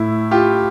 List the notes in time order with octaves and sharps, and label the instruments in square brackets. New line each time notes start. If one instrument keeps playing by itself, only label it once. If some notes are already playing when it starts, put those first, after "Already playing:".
Already playing: [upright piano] A2 [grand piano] E4
[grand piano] F4 G4